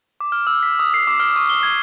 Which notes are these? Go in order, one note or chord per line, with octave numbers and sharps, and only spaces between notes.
D6
F6
E6
B6
D#6
C7
D6
F6
C#6
G7
G#6